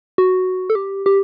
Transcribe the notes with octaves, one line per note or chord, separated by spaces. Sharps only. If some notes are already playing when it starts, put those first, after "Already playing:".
F#4
A4
G4
G4